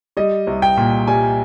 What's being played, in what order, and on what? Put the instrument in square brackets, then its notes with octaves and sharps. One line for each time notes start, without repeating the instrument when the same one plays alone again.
[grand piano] G3 D#5
C2
G5
A#2
G3 G#5